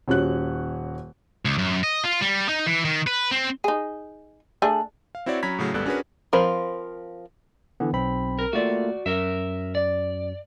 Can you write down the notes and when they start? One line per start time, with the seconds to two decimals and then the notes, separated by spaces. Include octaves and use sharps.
0.08 D#1 C#4 F#4 F#6
1.45 C#2
1.59 F#2
1.84 D#5
2.04 F4
2.21 G3
2.49 D#4
2.66 E3
2.85 D#3
3.07 B4
3.31 C4
3.64 D#4 G#4
4.62 A3 D4 G#4
5.15 F5
5.26 C4 E4 F#4 C#5 D5
5.43 F#3 C#4 A#5 B5 G#6 B6
5.58 A2 C#3 F#3 A3
5.74 G#1 C#2 G3 B3 A4 F#6
5.86 C#4 D4 F#4 G#4 A#4 B4
6.33 F3 C4 A#4 C5 B5
7.80 D3 E3 B3
7.93 B1 C4 B5
8.39 A#4
8.53 A3 A#3 F4 F#4 D5
9.06 F#2 A#4 E5
9.75 D5